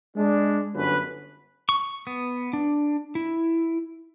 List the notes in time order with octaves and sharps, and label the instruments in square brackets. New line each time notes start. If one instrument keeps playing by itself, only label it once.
[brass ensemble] G#3 D4
G1 F#2 D3 C#4 B4
[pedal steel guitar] C#6
B3
D4
E4